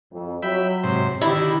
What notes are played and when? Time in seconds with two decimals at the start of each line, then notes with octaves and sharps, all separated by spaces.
0.12 F2
0.43 F#3 E5 G5 B5
0.84 G#2 C3 C5
1.22 D3 D#3 E4 G4